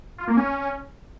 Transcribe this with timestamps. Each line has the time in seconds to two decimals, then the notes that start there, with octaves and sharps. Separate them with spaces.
0.18 F4
0.28 A#3
0.37 C#4